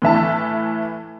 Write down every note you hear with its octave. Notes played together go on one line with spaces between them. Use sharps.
A2 E3 E5 A5